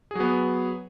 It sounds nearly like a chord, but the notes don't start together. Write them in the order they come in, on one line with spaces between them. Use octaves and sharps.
G#4 F#3 B3